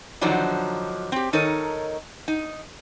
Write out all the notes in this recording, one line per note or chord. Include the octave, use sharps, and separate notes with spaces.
D3 D#3 F3 F#3 D4 D#4
C4 G4
D#3 D#4 A4 A#4 C#5 D#5
D#4